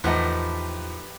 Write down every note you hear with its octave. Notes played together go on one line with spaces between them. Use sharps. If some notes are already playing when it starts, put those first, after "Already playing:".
E2 A2 F3 D#4 G4 B4 F#5 A5